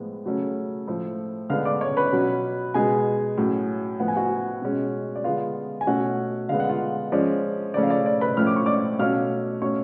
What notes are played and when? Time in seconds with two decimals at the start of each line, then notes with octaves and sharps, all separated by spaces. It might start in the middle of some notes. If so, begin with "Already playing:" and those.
Already playing: A2 F3 G#3 B3
0.25 C#3 F#3 A3 C#4
0.87 A2 F3 A3
1.50 D3 G#3 B3 F5 F6
1.65 D5 D6
1.81 C#5 C#6
1.97 B4 B5
2.13 B2 F#3 C#4
2.74 B2 G#3 B3 G#4 G#5
3.37 A2 F#3 C#4
4.00 A2 F3 B3 F#5
4.08 G#5
4.16 F#4 F#5
4.62 B2 G#3 C#4
5.15 D5
5.24 D3 G#3 B3 F4 F5
5.81 G#5
5.87 B2 A3 C#4 F#4 F#5
6.49 D3 G#3 B3 F5
6.60 F#5
6.69 F4 F5
7.12 F3 G#3 C#4 D5
7.74 C#3 F3 A3 C#4 D5
7.83 F5
7.90 D5
8.06 D5
8.21 B4 B5
8.37 A2 F3 A3 C#4 F6
8.47 D6
8.56 C#6
8.66 D5 D6
8.99 B2 F#3 A3 C#4 F5 F6
9.62 B2 A3 C#4 C#5 C#6